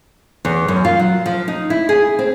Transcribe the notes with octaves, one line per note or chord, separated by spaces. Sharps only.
E2
F#2
F4
F#3
F3
D#4
E4
G#4
C4